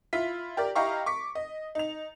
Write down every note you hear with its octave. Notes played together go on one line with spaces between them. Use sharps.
E4 F4 B6
G4 A#4 D5
E4 G4 D#5 F5 A#5 C#6
C#6 D6 B6
D#5
D#4 F7